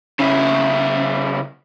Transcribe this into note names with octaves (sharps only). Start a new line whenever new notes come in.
C#3 E4